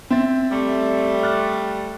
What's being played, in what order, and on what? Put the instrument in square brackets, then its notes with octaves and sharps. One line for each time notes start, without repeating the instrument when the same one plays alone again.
[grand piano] C4 E5 A6
[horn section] G3 A3
[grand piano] F6 F#6 A6